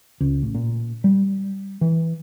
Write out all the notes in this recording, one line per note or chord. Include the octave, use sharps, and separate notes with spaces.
C#2
A1
A#2
G3
E3